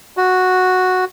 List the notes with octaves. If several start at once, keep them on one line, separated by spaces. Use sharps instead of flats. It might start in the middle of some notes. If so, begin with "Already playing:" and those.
F#4